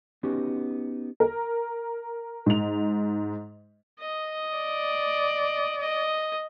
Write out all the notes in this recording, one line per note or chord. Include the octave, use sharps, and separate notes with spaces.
B3 C#4 D#4 F#4 G4
A#4
G#2 F7
D#5
D5
D#5